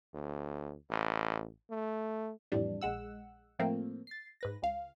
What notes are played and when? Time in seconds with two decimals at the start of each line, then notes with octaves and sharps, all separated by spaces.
0.14 D2
0.90 A1
1.71 A3
2.52 F2 A2 E3 G3 D4
2.81 A#1 G#3 F#5 E6
3.59 A2 F3 A3 A#3 C4
4.07 A6 C7
4.41 G#2 B4 A#6
4.62 C#2 F5